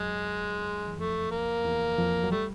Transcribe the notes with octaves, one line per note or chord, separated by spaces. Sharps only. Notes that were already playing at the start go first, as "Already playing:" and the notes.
Already playing: F#2 F#3 G#3
E3
F2 F3 A3
A#3
E2 E3
F2 F3
F#3
G3 A3